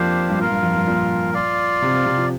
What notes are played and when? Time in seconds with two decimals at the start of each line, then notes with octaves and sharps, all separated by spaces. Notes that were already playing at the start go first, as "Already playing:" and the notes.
Already playing: F2 F3 A#3 C4 D4 G4 C5 F5
0.29 G2
0.39 A#2 F4 A#4 F5
0.50 G2
0.63 F2
0.75 G2
0.87 A#2
1.34 F4 D5 F5
1.82 C3
1.94 C3
2.06 C3
2.18 F3